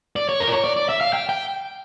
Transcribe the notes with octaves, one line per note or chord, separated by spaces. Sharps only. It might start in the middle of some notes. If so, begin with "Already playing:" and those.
D5
C#5
A#4
D5
C#5
D5
D5
E5
F5
G5
G5